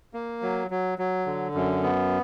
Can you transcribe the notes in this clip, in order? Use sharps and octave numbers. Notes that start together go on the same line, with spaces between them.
A#3
F#3
F#3
F#3
D3
F#2
B3